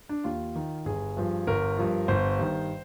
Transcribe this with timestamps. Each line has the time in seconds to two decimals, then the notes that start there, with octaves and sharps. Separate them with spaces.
0.09 D4
0.24 D#2 F4
0.55 D#3
0.85 G1 G#4
1.17 G2 F3
1.47 G1 A#4
1.77 G2 F3
2.08 G1 C5
2.39 G2 D#3